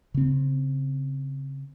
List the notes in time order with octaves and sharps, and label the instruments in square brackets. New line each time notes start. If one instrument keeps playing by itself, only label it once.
[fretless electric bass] C#3 C4